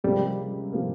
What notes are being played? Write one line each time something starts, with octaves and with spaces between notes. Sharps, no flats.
C#2 C3 F3 G3 A#3
C3 F3 A#3